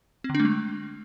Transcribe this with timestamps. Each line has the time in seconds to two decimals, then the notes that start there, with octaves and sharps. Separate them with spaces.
0.24 C4
0.29 D3
0.35 D4
0.40 A3
0.45 G#3